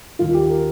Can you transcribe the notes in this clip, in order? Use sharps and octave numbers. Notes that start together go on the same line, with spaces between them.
D#2 D#3 F4
G4
A#4